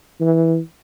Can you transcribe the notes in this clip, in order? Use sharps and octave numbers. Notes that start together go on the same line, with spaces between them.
E3